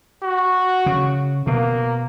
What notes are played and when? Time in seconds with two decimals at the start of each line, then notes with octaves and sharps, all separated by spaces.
0.23 F#4
0.86 C#3
1.47 B2 A#3